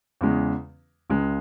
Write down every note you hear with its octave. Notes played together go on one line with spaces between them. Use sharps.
E2 C#3 G#3
C#2 C#3 G#3